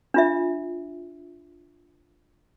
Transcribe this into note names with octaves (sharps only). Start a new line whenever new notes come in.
D4 F4 E5